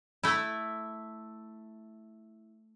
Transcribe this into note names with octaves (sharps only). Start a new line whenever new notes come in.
A3 E4